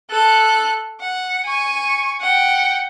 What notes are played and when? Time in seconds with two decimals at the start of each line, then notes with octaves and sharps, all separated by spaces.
0.10 A4 F#6
1.01 F#5
1.46 G#5 C#6
2.21 F#5 G5